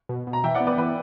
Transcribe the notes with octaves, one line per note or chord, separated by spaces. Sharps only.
B2
B2
A#5
E3 E5 G5
D5 F#5
B3
B4 D5
E3 B4